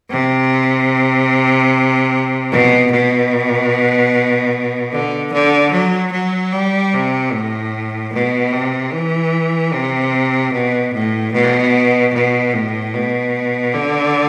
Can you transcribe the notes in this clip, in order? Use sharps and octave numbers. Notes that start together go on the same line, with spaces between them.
C3
B2
B2
D3
D3
F#3
F#3
G3
C3
A2
B2
C3
E3
C3
B2
A2
B2
B2
A2
B2
D3